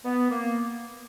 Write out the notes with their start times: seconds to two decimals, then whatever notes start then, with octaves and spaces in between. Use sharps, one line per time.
0.05 B3
0.30 A#3